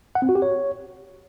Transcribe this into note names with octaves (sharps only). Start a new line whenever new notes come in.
F#5
C4
F#4
G4
C#5